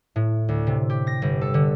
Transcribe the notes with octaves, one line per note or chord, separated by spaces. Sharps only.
A2
D2
C3
G4
A#6
G1
A4
D3